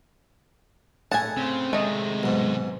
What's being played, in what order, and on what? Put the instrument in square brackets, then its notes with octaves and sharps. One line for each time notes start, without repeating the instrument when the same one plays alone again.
[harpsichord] A2 G#4 F#5 [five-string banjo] G#5 A5
[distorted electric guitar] C#3 [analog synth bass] C4
[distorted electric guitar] C3 D#3 [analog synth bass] G#3 [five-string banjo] A3 D#5
[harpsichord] B1 G#2